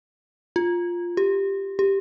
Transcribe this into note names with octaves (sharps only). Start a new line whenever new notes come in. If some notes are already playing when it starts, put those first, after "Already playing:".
F4
G4
G4